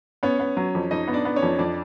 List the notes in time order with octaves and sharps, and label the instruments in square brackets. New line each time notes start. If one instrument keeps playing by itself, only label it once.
[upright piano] B3 [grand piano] C#4 C#5
[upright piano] B3
F#3
F2
[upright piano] F2 [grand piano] D#4 D#5
[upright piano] B3
[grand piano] D4 D5
[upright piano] B3
[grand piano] C#4 C#5
[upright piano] F2
[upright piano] F2 [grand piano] D4 D5